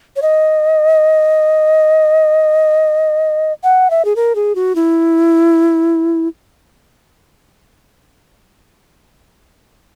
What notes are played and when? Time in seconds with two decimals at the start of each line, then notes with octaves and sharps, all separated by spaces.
0.16 C#5
0.22 D#5
3.63 F#5
3.90 E5
4.05 G#4
4.16 A#4
4.35 G#4
4.55 F#4
4.75 E4